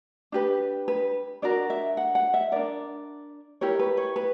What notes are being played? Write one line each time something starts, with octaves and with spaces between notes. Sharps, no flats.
D4 G4 B4
B4
D4 F#4 A#4 D5
E5
F#5
F#5
E5
D4 A#4 D5
E4 G4 A#4 C#5
B4
C#5
B4